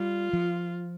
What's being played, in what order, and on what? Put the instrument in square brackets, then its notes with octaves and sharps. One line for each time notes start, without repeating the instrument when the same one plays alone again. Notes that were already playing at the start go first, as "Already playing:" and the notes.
Already playing: [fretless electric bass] G3 [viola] F4
[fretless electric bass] F3